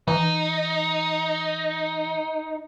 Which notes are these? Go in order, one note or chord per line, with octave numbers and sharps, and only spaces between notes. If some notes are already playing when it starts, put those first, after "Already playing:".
E3 D#4